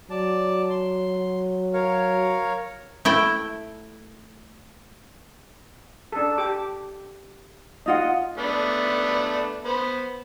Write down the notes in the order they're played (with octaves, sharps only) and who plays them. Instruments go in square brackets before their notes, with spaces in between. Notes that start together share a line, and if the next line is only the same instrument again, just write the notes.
[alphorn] F#3 [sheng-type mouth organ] D5 A5
[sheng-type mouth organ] C6
A#4 C#5 F5
[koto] A3 E4 G5
[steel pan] D4 A4
G4 D6
[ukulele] D#4 F4 F#5 [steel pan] D#5
[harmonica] A3 B3 D4
B3 C5